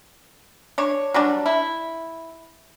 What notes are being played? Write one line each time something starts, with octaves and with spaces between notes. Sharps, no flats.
D4 C#5
F#3 G3 D4
E4